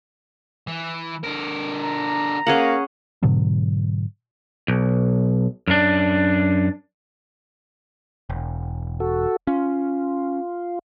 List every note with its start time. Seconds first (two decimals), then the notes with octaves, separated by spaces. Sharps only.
0.67 E3
1.24 D3 A#4
1.84 A#5
2.47 A#3 C#4 G#4 F#5
3.23 G#2 B2 D3 F#3
4.68 B1
5.68 F#2 D4
8.30 E1
9.00 F#4 A4
9.47 C#4 F4